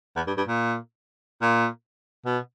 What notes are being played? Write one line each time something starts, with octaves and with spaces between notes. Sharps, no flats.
E2
G2
G2
A#2
A#2
B2